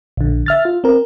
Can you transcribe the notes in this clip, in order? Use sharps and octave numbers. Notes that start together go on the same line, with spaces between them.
A#1 D3
E5 F6 A6
F4
C4 A#4